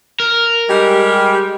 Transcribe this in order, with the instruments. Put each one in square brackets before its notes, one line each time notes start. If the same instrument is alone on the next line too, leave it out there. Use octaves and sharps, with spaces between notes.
[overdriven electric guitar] A#4
[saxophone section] G3 G#3 G4